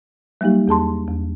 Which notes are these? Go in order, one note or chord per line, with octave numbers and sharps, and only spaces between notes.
F#3 G3 A#3 D#4 G4
E2 G#4 A5 C6
E2